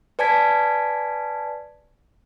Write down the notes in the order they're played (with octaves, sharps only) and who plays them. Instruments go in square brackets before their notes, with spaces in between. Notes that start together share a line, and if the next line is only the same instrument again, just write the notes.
[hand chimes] B4 D5 G#5 A5 G#6 B6